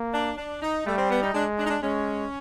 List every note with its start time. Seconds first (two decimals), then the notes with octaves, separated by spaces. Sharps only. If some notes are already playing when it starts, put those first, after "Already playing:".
Already playing: A#3
0.14 D4
0.38 D4
0.62 D#4
0.86 G3 A3
0.98 C4
1.11 B3
1.23 D#4
1.34 G#3 D4
1.59 D4
1.66 D#4
1.70 D4
1.83 G#3 C#4